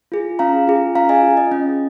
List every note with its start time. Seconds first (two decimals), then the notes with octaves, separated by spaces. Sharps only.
0.12 F4 G#4
0.39 C#4 F5 A#5
0.67 F4 G#4
0.95 C#4 F5 A#5
1.09 D#5 G#5
1.23 F4
1.28 G#4
1.37 D#5
1.52 C#4 D#5